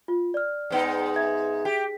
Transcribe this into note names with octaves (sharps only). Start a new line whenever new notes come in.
F4
D5 F6
G#2 B3 D#4
E5 G#6
G4